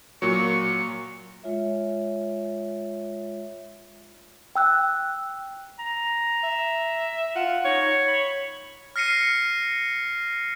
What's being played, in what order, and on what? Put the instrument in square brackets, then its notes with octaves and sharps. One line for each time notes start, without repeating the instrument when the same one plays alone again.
[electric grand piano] A#2 F#3 [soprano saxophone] C#6
[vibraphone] G#3 F4 C#5 E5
[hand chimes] G5 E6 F#6
[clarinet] A#5
[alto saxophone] E5
[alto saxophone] F4 [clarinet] F#5
[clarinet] D#4 [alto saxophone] C#5
[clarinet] B5
[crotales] F6 A#6 C7 C#7 D#7